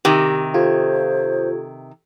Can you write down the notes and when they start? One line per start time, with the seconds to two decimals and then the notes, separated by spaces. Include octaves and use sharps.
0.05 C3 D#3 G4
0.54 F4 G4 A4 C5 G#6